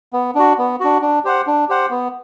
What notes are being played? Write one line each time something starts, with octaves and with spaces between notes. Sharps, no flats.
B3
D4 F#4
B3
D4 F#4
D4
G4 C5 F#5
D4
G4 C5 F#5
B3